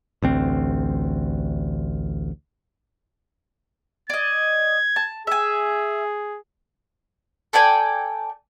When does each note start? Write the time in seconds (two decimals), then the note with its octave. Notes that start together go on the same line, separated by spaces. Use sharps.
0.22 A1 D2 C4
4.10 D5 D#5 G#6
4.96 A5
5.27 G#4 E5 G#5
7.53 A4 D5 G5 G#5